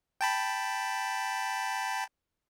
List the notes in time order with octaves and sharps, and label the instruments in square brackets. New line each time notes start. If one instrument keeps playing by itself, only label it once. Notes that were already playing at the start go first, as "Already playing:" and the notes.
[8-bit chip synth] G5 A5 B5